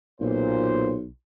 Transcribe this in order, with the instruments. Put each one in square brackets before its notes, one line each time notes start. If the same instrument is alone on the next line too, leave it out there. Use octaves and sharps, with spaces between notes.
[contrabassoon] B1 [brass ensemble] A#2 C5